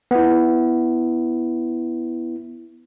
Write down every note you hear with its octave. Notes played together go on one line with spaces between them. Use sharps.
B3 E4